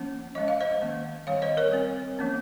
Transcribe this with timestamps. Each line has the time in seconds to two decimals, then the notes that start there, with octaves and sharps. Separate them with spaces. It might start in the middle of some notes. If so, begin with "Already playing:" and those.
Already playing: F3 A#3 C#4
0.35 F3 G#3 C#4 D#5
0.48 F5
0.61 C5 D#5
0.82 D#3 A#3 C#4
1.27 D#3 G3 C4 C#5 F5
1.42 C5 D#5
1.57 A#4 C#5
1.72 G3 C4
2.19 F3 A#3 C#4